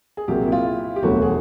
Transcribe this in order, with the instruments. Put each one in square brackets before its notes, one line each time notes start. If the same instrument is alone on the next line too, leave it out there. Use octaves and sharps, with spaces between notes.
[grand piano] G#4
[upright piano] C2 A#2 F#3 A#3 [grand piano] G4
[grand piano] E4
F4
G4
[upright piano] E1 D2 D3 F#3 A3 [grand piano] F#4
[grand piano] G#4